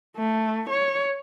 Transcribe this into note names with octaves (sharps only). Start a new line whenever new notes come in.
A3
C#5